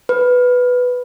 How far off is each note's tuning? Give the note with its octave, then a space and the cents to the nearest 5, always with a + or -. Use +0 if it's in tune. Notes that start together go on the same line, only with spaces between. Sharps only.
B4 +5